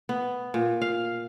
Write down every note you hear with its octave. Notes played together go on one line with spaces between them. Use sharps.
B3
A#2
F5